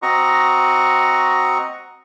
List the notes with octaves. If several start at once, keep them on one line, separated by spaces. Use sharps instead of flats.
C4 F#4 D#5 A#5 C#6